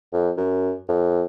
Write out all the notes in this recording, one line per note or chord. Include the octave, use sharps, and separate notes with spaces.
F2
F#2
F2